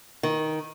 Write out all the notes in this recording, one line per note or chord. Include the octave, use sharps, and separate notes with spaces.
D#3